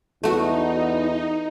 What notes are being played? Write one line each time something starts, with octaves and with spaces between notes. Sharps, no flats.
E2 A3 D#4 F#4